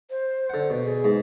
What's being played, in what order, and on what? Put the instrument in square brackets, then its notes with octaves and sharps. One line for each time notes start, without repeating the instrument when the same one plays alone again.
[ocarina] C5
[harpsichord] D3 F#5
B2
[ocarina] G#4
[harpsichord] G#2